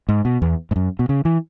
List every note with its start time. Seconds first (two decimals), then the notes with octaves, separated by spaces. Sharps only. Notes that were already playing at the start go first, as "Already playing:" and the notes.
0.09 G#2
0.25 B2
0.42 E2
0.71 G#2
0.76 F#2
0.99 B2
1.09 C#3
1.25 E3